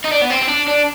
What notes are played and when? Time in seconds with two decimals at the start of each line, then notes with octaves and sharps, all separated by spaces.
0.04 D#4
0.12 D4
0.21 B3
0.30 C4
0.42 C4
0.49 D4
0.68 D4